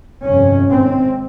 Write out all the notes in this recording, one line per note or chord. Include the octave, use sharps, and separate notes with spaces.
G1 F2 C3 C#4
G#1 G#2 C4